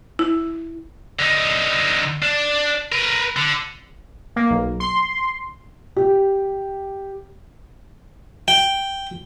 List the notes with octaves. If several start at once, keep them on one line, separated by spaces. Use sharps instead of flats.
E4
D3 D#4
D4
A#4 B4
D3
A#3
B1
C6
G4
G5